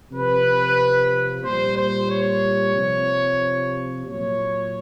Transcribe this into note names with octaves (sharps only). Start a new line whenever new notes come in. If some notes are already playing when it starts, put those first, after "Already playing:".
C3 F3 B4
A#2 G3 C5
C5
C#5
C3 F3
A#2 F#3 C#5